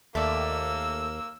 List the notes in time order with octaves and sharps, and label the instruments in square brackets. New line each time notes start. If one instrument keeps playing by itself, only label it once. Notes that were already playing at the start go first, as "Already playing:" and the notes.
[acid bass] D#2 [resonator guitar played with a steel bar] A3 D5 [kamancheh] A#3 E6